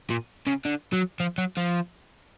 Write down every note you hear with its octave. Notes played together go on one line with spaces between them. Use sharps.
A#2
C#3
D3
F#3
F3
F#3
F3